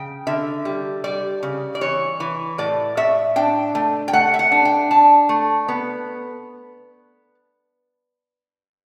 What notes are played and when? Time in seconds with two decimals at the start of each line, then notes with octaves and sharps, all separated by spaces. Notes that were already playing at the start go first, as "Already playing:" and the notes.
Already playing: C#3 G5
0.27 D3 E5
0.65 G3
1.04 G3 D5
1.43 C#3
1.75 D5
1.81 E3 C#5
2.20 E3
2.58 A2 D5
2.97 A2 E5
3.36 D4 G5
3.75 A3
4.08 G5
4.13 A3 F#5
4.34 E5
4.39 F#5
4.52 D4
4.65 G5
4.91 D4 A5
5.29 A3
5.68 B3